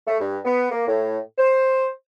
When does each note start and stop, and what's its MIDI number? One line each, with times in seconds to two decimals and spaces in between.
0.07 0.18 57
0.20 0.37 43
0.45 0.70 59
0.71 0.84 58
0.87 1.18 45
1.38 1.87 72